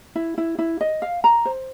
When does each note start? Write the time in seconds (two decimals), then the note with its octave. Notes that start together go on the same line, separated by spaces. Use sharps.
0.15 E4
0.38 E4
0.59 E4
0.81 D#5
1.02 F5
1.24 A#5
1.45 C5